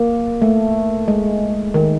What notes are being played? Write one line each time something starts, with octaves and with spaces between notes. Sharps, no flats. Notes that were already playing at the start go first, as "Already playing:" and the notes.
Already playing: A#3
A3
G#3
D#3